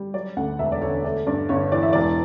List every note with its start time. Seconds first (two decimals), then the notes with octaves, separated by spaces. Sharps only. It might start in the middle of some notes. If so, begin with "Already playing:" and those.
Already playing: G3
0.14 F#3 D5
0.37 D2 F#5
0.59 E1 E5
0.72 D5
0.82 D3 C#5
1.04 A3 D5
1.26 G2 D5
1.49 G1 C#5
1.72 E3 D5
1.83 E5
1.93 E1 D5